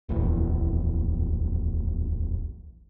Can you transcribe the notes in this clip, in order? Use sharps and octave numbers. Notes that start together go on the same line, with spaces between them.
D1 A#1 E2